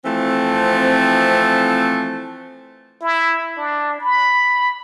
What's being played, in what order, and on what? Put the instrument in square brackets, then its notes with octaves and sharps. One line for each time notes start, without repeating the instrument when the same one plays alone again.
[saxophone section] E3 F3 A3 C4
[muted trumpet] E4
D4
B5